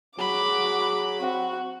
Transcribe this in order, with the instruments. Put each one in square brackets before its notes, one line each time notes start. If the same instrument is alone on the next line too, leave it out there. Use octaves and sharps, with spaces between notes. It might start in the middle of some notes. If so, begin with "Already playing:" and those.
[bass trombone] F#3 [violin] F#4 D6 [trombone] G#4 [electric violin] B5
[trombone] C4 [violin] F#4